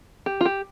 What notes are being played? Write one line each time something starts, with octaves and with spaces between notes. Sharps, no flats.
G4
F4
G4